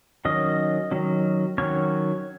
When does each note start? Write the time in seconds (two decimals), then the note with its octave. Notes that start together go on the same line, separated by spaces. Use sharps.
0.25 D#3 F#3 C#4 D#5
0.91 D#3 F#3 C#4
1.58 D#3 F#3 C#4 C#5